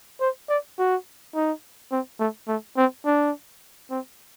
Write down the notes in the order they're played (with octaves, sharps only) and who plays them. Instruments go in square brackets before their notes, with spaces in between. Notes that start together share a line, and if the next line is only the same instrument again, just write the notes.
[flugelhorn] C5
D5
F#4
D#4
C4
A3
A3
C4
D4
C4